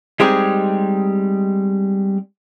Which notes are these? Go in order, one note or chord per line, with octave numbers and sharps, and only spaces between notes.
G3 G#3 C4 D#4 G4 G#4